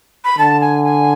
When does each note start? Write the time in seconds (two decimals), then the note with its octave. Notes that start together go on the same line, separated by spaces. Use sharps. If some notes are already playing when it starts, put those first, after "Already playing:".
0.24 B5
0.38 D3 A5
0.61 G#5
0.84 G#5